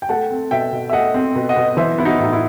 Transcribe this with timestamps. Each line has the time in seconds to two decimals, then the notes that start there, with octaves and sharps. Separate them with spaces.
0.02 G5
0.09 A3 F#5 A5
0.31 C4
0.51 B2 E5 G5
0.72 B2
0.90 E5
0.93 A3 D#5 F#5
1.14 C4
1.35 B2
1.49 D#5 F#5
1.56 B2
1.77 E3 C5 E5
1.98 B3 E4
2.05 D#4 F#4
2.20 A2 D#4
2.33 E4